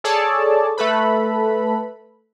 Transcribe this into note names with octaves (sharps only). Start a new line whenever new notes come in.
G#4 A4 C#5 D5 A5
A3 A4 B4 B5